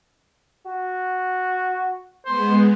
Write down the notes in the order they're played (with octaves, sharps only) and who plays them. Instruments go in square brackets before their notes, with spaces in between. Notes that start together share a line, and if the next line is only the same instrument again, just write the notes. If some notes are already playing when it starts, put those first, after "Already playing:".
[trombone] F#4
[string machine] G#3 B3 [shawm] C5